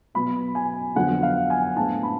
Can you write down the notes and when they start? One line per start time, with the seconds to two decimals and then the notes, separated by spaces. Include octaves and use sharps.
0.14 B2 F#3 B3 B5
0.55 G#5
0.95 F2 D3 F#3 B3 D4 F#5
1.23 F5
1.50 G#5
1.76 A2 G#3 B3 D4 A5
2.03 B5